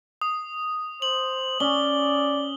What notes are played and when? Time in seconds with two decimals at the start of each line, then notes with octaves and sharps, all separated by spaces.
0.21 D#6
1.02 C5 F#7
1.60 C#4 D5 G7